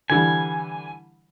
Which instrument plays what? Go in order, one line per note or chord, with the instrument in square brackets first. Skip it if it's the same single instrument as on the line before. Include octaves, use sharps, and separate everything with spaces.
[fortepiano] D3 E3 G3 [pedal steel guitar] G#5